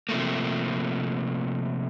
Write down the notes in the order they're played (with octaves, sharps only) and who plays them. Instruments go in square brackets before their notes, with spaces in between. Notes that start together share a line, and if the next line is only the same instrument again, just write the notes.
[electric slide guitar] C3 F3 A3 A#3